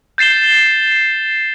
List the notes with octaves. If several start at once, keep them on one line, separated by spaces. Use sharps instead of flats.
G6 A6 C7 E7 G7